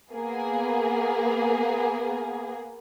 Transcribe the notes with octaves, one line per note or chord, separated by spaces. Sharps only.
A#3 B3 G#4